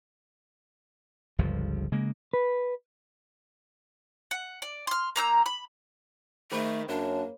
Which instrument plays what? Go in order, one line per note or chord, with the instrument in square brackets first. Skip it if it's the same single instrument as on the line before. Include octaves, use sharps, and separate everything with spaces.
[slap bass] G1 C#2 G2 F3
C#3 G#3 A#3
[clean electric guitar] B4
[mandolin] F#5
D5
C6 F6
A#3 A#5 E6 G6
B5
[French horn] D#3 [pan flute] A3 [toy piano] G#4 C5 B5
[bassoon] F#2 [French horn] A#3 [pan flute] D4 [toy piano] C#5